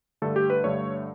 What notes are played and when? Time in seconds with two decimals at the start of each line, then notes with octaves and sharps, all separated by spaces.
0.22 G2 D3 A3 A4
0.36 G4
0.50 B4
0.64 G2 D3 A3 C#5